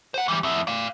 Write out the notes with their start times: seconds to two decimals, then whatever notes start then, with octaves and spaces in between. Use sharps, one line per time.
0.14 C5 F#5
0.28 E3 G3
0.43 F2 E4
0.67 D5 F5